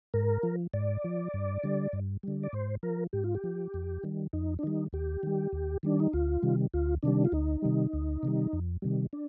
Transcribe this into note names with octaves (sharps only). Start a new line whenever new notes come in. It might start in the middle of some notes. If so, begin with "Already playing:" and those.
G#2 A#4
F3
G#2 D5
F3
G2
D3 G3
G2
D3 G3
D5
G#2 C5
F3 A#4
G#2 G4
F4
G4
F3
F2
D#3 G3
F2 D#4
D4
D#3 G3 D#4
D#2 G4
D#3 G3
D#2
D#3 G3 D4
D#4
D2 F4
C3 D#3 G3
D2 F4
C3 D#3 G3 D4
F4
D2 D#4
C3 D#3 G3
D2
C3 D#3 G3
F2
C3 D#3 G3
D4